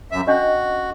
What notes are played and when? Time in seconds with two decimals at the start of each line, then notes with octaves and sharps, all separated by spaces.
0.12 F#2 E5
0.27 C#4 D4 F#4 D#5